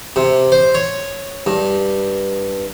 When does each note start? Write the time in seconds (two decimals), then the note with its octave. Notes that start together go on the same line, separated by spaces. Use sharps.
0.16 C3
0.52 C5
0.75 C#5
1.46 G2